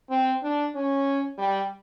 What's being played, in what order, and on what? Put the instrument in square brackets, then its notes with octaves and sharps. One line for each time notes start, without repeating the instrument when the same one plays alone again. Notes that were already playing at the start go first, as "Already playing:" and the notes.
[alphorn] C4
D4
C#4
G3